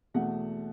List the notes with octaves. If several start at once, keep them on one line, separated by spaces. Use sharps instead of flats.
E2 B2 A3 F#5